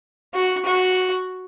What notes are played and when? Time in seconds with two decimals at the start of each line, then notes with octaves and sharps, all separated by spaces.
0.34 F#4
0.65 F#4